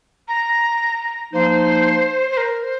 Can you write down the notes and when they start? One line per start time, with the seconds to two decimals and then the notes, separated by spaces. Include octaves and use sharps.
0.28 A#5
1.33 F3 A#3 D#4 C5
2.31 C5
2.37 A#4
2.63 C5